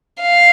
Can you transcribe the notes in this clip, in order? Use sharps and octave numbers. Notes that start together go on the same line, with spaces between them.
F5